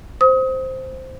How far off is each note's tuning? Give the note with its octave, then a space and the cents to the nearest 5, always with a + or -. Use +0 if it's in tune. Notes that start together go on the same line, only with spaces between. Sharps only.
C5 +0 D#6 +30